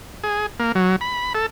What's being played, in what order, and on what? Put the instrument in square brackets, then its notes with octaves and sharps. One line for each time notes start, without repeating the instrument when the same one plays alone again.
[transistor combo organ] G#4
A#3
F#3
B5
A4